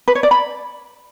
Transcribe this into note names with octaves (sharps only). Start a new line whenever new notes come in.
B4
C#5
D5
B5